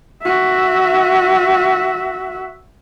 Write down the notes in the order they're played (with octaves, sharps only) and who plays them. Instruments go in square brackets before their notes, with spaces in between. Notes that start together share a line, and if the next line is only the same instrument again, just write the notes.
[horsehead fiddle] F#4 E5